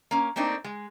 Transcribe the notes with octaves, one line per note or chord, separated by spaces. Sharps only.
A#3 C#4
A3 A#3 C4 D4 D#4
G#3